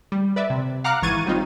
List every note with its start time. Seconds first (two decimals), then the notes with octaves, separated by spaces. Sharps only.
0.12 G3
0.36 B4 D5 E5
0.50 C3
0.84 F5 F#5 A#5 D6 F6 F#6
1.02 G#1 E3 C#6 G#6 A6 D#7
1.26 F#3 G3 C4 D#4 F4